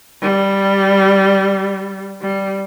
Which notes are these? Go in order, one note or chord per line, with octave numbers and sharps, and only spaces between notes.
G3
G3